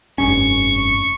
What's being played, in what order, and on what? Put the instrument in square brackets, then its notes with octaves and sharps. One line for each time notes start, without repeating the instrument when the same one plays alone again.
[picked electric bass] F1 G2 C#4 [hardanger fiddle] C#6